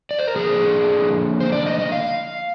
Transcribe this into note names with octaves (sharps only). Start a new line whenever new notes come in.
D5
C5
A#4
D3 F3 A#3 G#4
C5
D5
D#5
D#5
F5